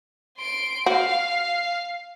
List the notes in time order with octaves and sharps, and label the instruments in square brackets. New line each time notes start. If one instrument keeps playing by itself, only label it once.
[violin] C6 D7
[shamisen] F#4 [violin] F5